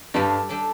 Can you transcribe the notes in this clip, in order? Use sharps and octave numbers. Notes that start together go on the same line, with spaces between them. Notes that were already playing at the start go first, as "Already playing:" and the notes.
G2 G3 D4 A4 D5
G3 D4 A4 D5